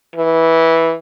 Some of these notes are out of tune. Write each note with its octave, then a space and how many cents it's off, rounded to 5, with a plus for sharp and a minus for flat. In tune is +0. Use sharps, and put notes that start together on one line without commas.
E3 -10